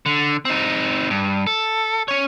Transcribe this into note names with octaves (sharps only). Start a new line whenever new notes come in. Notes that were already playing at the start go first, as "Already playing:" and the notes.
D3
C4 D#4
G2
A4
C#4 C#5